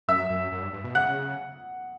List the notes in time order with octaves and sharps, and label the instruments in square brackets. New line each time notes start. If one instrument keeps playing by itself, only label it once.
[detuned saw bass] F#2 [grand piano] E5 E6
[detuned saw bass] F#2
F#2
G2
G2
B2
[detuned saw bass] C#3 [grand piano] F#5 F#6